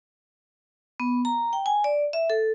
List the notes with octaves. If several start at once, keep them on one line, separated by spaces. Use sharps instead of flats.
B3
A#5
G5
G#5
D5
E5
A4